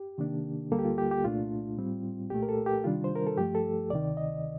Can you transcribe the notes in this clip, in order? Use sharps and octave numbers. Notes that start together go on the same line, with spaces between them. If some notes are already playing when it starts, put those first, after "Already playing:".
Already playing: G4
C3 D#3 A#3 D4
D2 D3 G3 A#3 A4
G4
F4
G4
G4
C2 A#2 A3 D4 F4
A2 G3 C4
C2 A#2 A3 G4
A#4
A4
G4
C3 D#3 G3 D4 F4
C5
A#4
A4
G2 F3 A3 G4
A4
D2 C3 D#3 D5
D#5